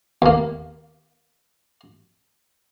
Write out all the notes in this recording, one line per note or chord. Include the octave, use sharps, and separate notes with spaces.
D#2 A#3